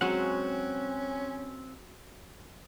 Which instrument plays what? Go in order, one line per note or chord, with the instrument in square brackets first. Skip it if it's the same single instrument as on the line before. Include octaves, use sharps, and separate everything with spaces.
[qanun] F#3 G#3 [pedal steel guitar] C4 F#5 [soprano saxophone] C#4